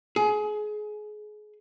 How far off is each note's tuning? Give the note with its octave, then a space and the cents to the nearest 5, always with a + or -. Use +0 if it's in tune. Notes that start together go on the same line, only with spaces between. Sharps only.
G#4 +25